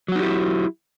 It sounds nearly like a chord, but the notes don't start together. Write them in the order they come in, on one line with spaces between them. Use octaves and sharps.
F#3 F#4 D#4 G4 E4